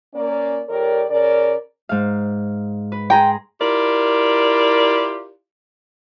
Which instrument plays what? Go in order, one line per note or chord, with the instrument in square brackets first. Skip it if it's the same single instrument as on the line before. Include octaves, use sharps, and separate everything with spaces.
[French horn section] A#3 C#4 D5
F2 G4 A#4 C#5 D5
C#3 C#4 A#4 D5
[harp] G#2 F5
B4
[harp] G#4 A#5 C6 [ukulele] G5
[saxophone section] E4 F4 G4 A#4 D5